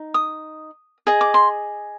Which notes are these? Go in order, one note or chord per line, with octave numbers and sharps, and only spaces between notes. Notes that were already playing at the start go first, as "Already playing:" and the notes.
Already playing: D#4
D#6
G#4 D#5 D#6
D6
C6